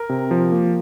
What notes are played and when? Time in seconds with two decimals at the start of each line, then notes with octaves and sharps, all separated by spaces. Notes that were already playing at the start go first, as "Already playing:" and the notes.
Already playing: A#4
0.09 C3
0.31 F3
0.52 A#3